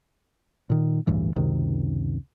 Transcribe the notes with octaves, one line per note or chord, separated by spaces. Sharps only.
A#2 D#3
A1 D2 G2 E3
C#2 F#2 C3 D#3